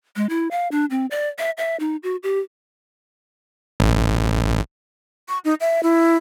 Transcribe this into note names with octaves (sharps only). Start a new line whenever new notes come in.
G#3
E4
F5
D4
C4
D5
E5
E5
D#4
F#4
G4
A1
C#6
D#4
E5
E4